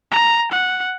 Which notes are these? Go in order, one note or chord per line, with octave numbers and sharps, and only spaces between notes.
A#5
F#5